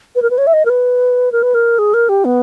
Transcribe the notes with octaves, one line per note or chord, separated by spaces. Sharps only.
B4
A#4
B4
C#5
E5
D#5
A#4
B4
A#4
B4
A#4
G#4
A#4
G4
B3